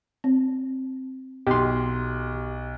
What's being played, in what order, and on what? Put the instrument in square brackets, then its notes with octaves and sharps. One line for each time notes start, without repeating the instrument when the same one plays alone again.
[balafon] C4
[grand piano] B1 [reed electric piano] G4 C6